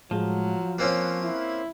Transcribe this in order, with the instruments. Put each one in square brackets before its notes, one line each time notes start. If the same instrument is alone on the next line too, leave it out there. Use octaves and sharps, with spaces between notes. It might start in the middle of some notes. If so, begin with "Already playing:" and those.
[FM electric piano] A2 G#3 [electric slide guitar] F3 [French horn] F#3
[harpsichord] A#3 C4 C#4 [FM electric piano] F6 F#6
[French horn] E4